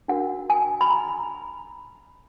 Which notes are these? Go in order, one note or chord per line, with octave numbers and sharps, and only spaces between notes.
D4 F#4 A#4 F#5
G#5
B5
A#5